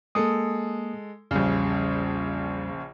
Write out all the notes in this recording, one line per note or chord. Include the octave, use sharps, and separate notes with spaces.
G#3 A#3 A4 D#6
A#1 E2 C#3 G3